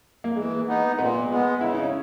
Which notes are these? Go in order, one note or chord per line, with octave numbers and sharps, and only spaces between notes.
A#3
E3 G#3
B3 D#4
A#2 B3
G#3 B3
C#3 E4
D#4
C#4